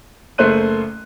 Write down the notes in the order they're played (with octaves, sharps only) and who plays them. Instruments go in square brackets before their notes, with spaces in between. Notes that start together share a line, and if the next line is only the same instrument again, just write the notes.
[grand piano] F#1 A3 A#3 C5 F#6 D#7